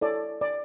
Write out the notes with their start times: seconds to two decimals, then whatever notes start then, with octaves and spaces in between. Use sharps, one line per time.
0.01 E4 A4 C#5 D5
0.41 D5